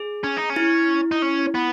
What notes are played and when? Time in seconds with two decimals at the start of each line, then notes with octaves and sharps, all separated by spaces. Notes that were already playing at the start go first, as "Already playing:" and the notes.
Already playing: G#4
0.24 C#4
0.37 D#4
0.50 C#4
0.56 E4
1.11 D#4
1.22 C#4
1.55 B3